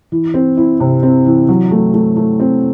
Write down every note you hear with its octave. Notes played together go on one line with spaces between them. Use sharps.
E3
C4
E4
C3
C4
E3
F#3
A3
A3
A3
C4